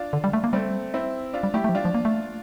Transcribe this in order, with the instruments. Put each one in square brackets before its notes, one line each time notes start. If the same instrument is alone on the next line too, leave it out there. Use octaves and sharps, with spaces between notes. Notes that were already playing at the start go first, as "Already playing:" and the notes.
Already playing: [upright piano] D4 F4
[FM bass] D3
G3
A3
A#3
[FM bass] G3 [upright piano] A3 C4
[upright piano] C4 E4
D4 F4
[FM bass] G3
[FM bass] A3 [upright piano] E4 G4
[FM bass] A3
F3
[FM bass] G3 [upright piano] D4 F4
[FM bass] F3
A#3
A3